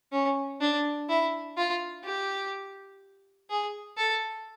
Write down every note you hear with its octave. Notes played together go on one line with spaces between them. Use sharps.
C#4
D4
E4
F4
G4
G#4
A4